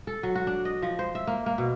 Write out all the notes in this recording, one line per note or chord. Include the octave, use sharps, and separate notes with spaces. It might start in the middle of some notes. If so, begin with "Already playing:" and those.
A4
F#3
F#4
D4
D#5
F3
C5
E5
A#3
A#3
B2